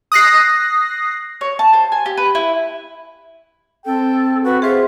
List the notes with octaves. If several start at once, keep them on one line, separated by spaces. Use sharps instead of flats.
D#6 F#6 A#6 C7
C#5
A5
C5
G#5
G4
B4
E4
C4 A4 G5
F#4 B4
F4 G#4 C5 E5